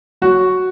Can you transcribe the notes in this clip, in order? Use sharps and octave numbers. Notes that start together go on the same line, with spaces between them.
F#3 F#4